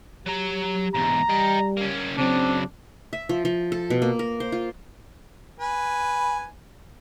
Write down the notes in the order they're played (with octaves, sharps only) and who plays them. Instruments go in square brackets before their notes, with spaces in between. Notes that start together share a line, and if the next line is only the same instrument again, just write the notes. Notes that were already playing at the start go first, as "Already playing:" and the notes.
[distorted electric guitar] F#3 A#5 [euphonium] G4
[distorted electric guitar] E2 G#2 [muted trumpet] A#5
[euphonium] G3 [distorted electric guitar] D#5 G5
[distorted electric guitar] A#3 C#4
[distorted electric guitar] C#3 F#3 [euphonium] C4 [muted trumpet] D4
[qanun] E5
F3
F3
A4
B2
A#3
A#4
C5
F4
[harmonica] B4 G#5